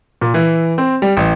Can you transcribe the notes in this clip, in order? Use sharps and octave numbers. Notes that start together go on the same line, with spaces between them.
A#2
E3
C4
G3
A1